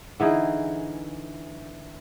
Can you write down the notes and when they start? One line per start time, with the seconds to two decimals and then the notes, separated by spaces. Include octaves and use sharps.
0.20 D3 E3 D#4 G#4